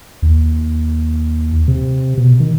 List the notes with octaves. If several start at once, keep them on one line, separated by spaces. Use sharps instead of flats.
D#2
C3
B2
D#3